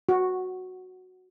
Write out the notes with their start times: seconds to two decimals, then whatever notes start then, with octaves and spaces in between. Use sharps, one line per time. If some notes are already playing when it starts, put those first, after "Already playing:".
0.09 F#4